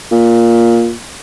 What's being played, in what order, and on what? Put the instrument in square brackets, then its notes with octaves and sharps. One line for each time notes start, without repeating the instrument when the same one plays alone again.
[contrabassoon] A#2